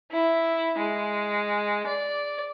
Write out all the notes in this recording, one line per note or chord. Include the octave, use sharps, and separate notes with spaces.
E4
G#3
D5